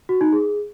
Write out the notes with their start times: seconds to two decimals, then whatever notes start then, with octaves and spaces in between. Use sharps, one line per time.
0.09 F#4
0.21 D#4
0.33 G#4